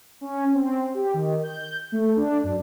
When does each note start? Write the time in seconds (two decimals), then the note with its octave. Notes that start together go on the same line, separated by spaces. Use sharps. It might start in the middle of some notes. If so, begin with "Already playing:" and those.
0.21 C#4
0.55 C4
0.94 G4
1.14 D#3
1.43 G6
1.92 A3
2.16 D4
2.43 F#2